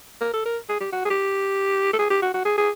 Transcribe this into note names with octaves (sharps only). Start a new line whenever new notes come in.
A#4
A4
A#4
G#4
G4
F#4
G#4
G4
A4
G#4
G4
F#4
F#4
G#4
G#4